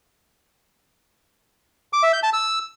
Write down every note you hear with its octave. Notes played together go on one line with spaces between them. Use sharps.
D6
E5
G6
A5
E6